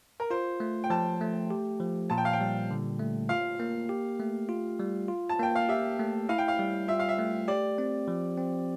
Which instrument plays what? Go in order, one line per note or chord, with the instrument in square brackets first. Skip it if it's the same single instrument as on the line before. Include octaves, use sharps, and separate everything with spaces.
[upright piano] A#4
[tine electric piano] F4 [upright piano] C5
[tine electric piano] A3
[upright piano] G5
[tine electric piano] F3 [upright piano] A5
[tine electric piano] A3
G4
F3
[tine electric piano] A#2 [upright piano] A5
[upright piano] G5
F5
G5
[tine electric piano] G3
D3
A3
[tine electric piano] F4 [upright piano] F5
[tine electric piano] A#3
G4
A3
F4
G3
F4
[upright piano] A5
[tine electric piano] A#3 [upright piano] G5
[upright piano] F5
[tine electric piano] G4 [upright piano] E5
[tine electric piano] A3
[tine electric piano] E4 [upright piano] F5
[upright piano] G5
F5
[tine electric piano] G3
[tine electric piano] F4 [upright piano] E5
[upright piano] F5
E5
[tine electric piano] A3
[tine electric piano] G4 [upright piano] D5
[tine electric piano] C4
F3
C4